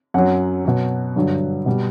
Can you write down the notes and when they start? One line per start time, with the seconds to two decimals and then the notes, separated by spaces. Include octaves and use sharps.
0.14 F#2 F#3 F#5
0.65 B2 F#3
1.16 G2 D3 F#3
1.66 B2 G3